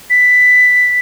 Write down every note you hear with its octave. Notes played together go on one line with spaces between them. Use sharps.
B6